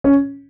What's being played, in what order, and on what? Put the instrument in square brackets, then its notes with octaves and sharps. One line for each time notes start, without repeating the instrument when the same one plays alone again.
[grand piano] C#4